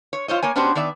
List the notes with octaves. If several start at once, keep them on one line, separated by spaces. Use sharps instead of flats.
C#5
F4 C5 C#5 D#5
A#3 C#5 G#5
B3 C#4 D4 F#4 G4 C5
D#3 B3 D5 E5